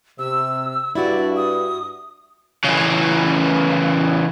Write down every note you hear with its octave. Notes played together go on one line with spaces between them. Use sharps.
C3 E6
G2 E4 F#4 D5
D#6
C#3 E3